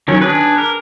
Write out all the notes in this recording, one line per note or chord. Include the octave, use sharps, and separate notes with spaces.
D#3 F#3 C#4
D4 G#4 B4
A#4